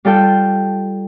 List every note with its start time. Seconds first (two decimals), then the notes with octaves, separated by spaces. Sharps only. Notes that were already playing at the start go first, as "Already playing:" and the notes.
0.05 G3 F4 A4 G5